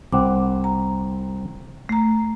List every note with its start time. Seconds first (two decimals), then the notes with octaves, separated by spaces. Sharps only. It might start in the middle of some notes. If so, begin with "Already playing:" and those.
0.12 C2 C4 F#5 D6
0.64 A#5
1.89 A3 A#5